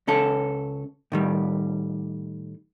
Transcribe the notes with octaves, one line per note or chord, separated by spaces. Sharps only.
C#2 C#4 A4
A2 D#3 G3